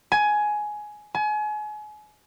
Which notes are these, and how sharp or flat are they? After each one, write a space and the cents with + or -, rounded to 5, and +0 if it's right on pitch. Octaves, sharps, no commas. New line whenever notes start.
G#5 +15
G#5 +35